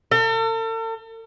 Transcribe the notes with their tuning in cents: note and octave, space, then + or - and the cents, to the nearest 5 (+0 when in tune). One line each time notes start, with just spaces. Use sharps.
A4 +40